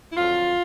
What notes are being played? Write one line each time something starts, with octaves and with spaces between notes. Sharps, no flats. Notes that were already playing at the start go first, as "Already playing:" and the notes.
E4
F2 D3 F#3 F4